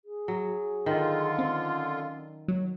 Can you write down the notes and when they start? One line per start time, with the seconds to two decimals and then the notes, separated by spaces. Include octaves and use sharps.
0.05 G#4
0.28 F#3
0.86 D3 D#3 F4
1.39 C4 C#4
2.48 F#3 C#5